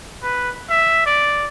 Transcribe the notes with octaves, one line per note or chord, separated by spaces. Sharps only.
B4
E5
D5